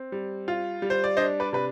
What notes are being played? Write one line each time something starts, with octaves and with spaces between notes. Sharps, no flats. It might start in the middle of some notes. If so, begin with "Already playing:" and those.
Already playing: C4
G3
F4
G3
C5
D5
D4 C5 D#5
B4 D5
C3 B4